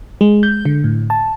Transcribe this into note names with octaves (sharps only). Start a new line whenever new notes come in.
G#3
G6
D3
A2
A5